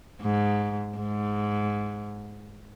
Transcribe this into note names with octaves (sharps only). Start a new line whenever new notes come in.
G#2
G#2